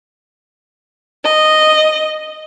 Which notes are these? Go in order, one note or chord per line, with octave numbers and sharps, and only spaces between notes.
D#5